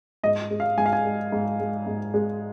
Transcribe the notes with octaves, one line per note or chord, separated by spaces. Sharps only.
G#2 D#5
G#3
F5
G#2 G#5
F5
G#5
G#3
G#2
G#3
G#2
G#3